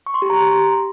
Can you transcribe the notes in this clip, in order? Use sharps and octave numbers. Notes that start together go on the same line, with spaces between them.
C#6
C6
G4
A#5